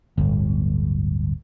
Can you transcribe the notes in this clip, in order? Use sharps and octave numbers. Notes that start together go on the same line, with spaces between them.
D1 G1